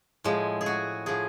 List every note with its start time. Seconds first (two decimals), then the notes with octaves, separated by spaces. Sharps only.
0.24 A2 F3 G#3
0.61 G#4
0.66 F#4
1.06 A2 F3 G#4